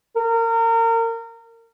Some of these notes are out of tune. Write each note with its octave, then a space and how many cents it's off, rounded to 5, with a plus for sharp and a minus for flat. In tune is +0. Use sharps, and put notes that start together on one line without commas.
A#4 -30